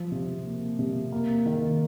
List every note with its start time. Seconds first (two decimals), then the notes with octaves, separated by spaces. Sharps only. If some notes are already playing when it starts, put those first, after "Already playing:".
Already playing: F3
0.12 C3
0.45 A#3
0.79 C3
1.12 A#3
1.46 D#3